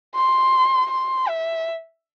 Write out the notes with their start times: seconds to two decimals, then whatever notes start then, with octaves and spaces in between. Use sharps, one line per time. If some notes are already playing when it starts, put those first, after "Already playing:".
0.15 C6
0.90 C6
1.28 E5